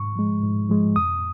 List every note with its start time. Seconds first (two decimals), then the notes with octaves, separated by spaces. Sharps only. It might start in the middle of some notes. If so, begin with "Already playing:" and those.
Already playing: G#2 C#6
0.16 F3 G#3
0.43 G#2
0.69 F3 G#3
0.96 F2 D#6